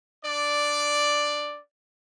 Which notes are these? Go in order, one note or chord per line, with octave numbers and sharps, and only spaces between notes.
D4 D5